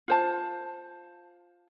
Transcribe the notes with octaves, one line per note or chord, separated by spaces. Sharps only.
F4 C5 A5